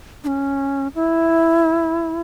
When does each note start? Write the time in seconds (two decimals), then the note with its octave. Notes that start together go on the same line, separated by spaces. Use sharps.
0.24 D4
0.27 C#4
0.95 E4